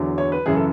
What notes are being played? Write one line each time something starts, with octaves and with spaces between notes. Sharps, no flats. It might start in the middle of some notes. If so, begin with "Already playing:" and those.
Already playing: E2 D3 F#3
C#5
B4
F#2 C#3 E3 G#4
A4